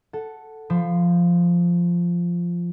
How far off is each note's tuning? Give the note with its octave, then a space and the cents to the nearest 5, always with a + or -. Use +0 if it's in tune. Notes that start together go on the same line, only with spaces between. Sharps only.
A4 +0 F#5 +5
F3 -5 B5 +35